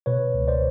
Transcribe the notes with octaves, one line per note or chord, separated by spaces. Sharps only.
B2 B4 C#5
C#2
C5 D5